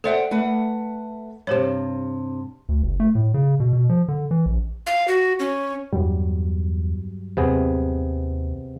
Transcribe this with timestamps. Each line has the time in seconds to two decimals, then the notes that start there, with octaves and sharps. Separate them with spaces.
0.04 A4 C5 D5 E5 F#5 G5
0.31 A3 B4 F#5
1.47 G2 C3 G4 C5 C#5
2.69 D2
2.83 F#1
3.00 A3
3.15 A2
3.34 C#3
3.60 B2
3.73 B2
3.89 F3
4.08 D3
4.31 E3
4.46 A#1
4.87 F5
5.08 F#4
5.39 C#4
5.93 E2 G2 F#3 G3
7.37 D#2 C3 B3 G#4